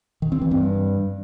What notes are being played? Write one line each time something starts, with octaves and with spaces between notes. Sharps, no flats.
D#3
C4
E3
G2